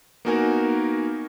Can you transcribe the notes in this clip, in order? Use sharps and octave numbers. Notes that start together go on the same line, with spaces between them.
A#3 B3 D#4 F#4 A#4 G#5